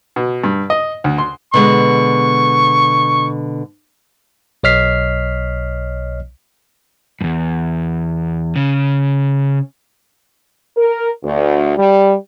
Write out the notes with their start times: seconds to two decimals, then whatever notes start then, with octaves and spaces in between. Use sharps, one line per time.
0.16 B2
0.44 G2
0.70 D#5
1.04 D2
1.18 C6
1.54 B2 D3 G#3 C#6
4.63 B1 C#5 D#5 F6 B6 C7
7.21 E2 G2
8.56 C#3
10.76 A#4
11.23 D2
11.77 G3